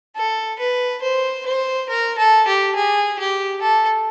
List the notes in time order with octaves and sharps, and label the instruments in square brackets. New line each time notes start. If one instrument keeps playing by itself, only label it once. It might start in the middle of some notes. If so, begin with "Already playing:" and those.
[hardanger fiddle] A4
B4
C5
C5
A#4
A4
G4
G#4
G4
A4